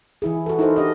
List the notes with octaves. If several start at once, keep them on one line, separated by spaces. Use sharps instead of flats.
E3 E4 G#4
F#4 A4
D#4 E4 A4 A#4 C5
D4 G4 A4 D5 D#5